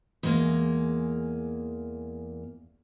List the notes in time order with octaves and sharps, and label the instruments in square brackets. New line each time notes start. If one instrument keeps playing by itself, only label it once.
[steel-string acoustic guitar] E2 G#3 A#3